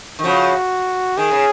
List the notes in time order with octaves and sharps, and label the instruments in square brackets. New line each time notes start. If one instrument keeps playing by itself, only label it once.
[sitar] D#3
[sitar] C#3 F3 [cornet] F#4
[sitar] D#3 [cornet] G#4
[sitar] C#3